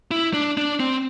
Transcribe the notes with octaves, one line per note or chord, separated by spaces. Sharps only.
E4
D4
D4
C4